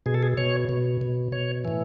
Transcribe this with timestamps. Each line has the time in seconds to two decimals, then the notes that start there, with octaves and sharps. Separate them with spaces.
0.06 B2 G#4
0.14 A4
0.23 G#4
0.37 B2 C#5
0.69 B2
1.01 B2
1.32 B2 C#5
1.65 A2 E3